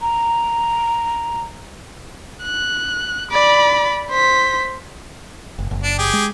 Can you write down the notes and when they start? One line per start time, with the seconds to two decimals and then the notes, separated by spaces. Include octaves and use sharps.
0.02 A#5
2.44 F#6
3.31 D5 B5
4.10 C5 B6
5.58 F#1
5.71 F#1
5.83 D4
5.98 G4 G#4
6.13 G#3